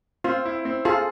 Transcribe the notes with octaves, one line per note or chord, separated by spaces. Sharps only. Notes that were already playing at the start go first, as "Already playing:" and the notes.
C4 F4
E4
C4
F4 G#4 A4